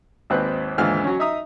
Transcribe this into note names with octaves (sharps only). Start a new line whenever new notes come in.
G#1 D#2 C4 D#4 B4 F#6
D#2 G#2 D3 E3 F4 F6
F#3 C#4
D#4 E5 A#5 D#6